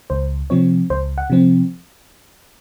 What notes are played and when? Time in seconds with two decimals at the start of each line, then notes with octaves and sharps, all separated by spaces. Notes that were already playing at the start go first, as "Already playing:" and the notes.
0.10 C#2 C5
0.50 C3 F3 C4 C#5
0.90 C#2 C5
1.18 F#5
1.30 C3 F3 C4